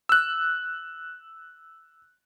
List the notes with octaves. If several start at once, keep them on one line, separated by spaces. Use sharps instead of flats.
E6 F#6